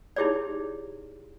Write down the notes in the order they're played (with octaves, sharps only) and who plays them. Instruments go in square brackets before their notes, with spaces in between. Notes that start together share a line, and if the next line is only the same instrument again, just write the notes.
[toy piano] D#4 E4 G4 G#4 C#5 D5